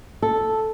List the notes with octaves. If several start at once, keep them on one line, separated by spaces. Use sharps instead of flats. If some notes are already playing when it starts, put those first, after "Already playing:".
A4